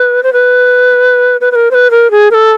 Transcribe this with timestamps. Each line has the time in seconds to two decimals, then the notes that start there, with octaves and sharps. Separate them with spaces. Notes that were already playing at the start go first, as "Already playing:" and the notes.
Already playing: B4
0.23 C5
0.33 B4
1.41 B4
1.52 B4
1.55 A#4
1.71 C5
1.74 B4
1.91 A#4
2.11 G#4
2.31 A#4
2.34 A4